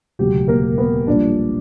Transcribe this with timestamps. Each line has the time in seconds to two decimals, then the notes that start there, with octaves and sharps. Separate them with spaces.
0.19 E1 D2 C#3 F#3 G4
0.48 A#3 A#4
0.78 B3 B4
1.07 A#1 A#2 G3 D4 D5